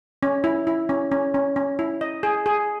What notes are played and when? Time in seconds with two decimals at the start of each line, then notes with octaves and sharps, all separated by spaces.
0.23 C#4
0.44 E4
0.67 E4
0.89 C#4
1.12 C#4
1.34 C#4
1.56 C#4
1.79 E4
2.01 D#5
2.23 G#4
2.46 G#4